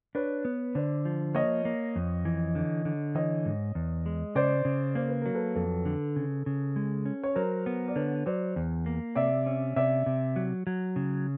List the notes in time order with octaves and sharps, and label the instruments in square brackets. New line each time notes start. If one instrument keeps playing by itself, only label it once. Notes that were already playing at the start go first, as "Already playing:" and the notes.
[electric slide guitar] D4 [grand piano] B4 C#5
[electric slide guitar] B3
[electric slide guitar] D3 [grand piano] C5 D5
[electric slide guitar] F3
[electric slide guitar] A#3 [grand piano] C#5 D#5
[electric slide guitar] A#3
F2
E3
D3
D3
[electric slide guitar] E3 [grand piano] C#5 D#5
[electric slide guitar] G#2
E2
G#3
[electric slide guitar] C#3 [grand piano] C5 D5
[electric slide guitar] C#3
[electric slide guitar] A#3 [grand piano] C5
[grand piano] B4
[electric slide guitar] F#3 [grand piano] A#4
[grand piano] A4 B4
[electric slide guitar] F2 [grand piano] A4 B4
[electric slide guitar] D3
C#3
C#3
G#3
C#4
[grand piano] C#5
[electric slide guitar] F#3 [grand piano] A#4 C5
[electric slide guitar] B3
[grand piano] D5
[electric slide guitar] D3 [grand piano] B4 C#5
[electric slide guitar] F#3 [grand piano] C5 D5
[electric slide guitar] E2
A#3
[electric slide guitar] C3 [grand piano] D5 E5
[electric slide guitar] C#4
[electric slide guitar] C3 [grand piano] D5 E5
[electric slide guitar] C3
F#3
F#3
C#3